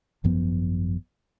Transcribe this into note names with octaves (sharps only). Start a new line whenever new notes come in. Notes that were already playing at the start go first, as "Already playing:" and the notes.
G#1 F#2 F3 B3